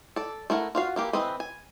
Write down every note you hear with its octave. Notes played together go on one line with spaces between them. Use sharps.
A4 D5
A3 E4 A#4 F#5
F4 F#4 F5
E3 A#3 G4
E3 C4 B4 D#5 B5
G#5